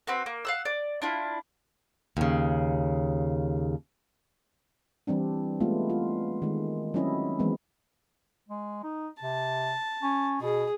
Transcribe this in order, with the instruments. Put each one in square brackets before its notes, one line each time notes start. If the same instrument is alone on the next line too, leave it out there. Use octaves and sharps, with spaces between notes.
[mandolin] C4 F#4 B4
A#3
F5 F#5 E6
D5
D4 E4 F4
[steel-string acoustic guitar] D#2 C#3
[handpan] E3 G3 C4 D4
G#3 A3 B3 E4 F4
F4
D#3 G#3
F#3 C4 C#4 E4 D#5
E3 F#3 G#3 B3 C4
[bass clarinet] G#3
D#4
[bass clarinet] C3 [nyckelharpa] A5
[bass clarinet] C#4
[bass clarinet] B2 [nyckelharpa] G#4